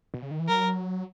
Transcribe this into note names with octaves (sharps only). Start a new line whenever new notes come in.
B2
C#3
D#3
E3
F#3 A#4